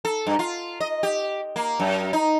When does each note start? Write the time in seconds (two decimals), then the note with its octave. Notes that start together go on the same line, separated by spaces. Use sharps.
0.05 A4
0.27 G2
0.39 F4
0.80 D#5
1.03 G4
1.56 A#3
1.80 F#2
2.13 D#4